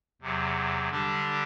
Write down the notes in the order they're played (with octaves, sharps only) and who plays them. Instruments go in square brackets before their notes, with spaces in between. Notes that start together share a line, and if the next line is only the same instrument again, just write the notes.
[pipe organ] E2 C3 F#3
D3 G3 D4 G4